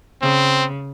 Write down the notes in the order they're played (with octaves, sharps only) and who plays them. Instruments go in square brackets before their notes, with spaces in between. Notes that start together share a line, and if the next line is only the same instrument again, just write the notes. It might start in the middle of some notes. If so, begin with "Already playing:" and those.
[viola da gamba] C#3 [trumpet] C4